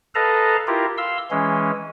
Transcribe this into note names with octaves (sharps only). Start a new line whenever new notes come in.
A4 B4 D#5 F5 A5 A#5
E4 F4 G4 A#4
F5 C6 E6
E3 G#3 C#4